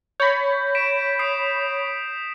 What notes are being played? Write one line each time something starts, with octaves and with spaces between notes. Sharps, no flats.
C#5 B5 G6 A#6
B6 D7 E7
D#6 C7 D7